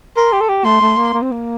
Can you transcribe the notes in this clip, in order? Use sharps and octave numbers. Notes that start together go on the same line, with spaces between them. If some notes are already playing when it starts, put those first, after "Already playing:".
A#4 C6
G4
A4
G4
A3 C6
A3
A#3
A#3
C4
A#3